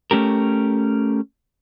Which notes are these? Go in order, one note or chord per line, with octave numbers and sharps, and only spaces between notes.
A3 C#4 G4 A#4